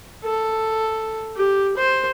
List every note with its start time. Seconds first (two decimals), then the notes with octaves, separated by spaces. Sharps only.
0.24 A4
1.36 G4
1.77 C5